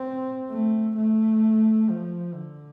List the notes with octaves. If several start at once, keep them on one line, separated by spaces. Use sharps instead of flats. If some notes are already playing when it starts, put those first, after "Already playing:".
Already playing: C4
A3
A3
F3
D3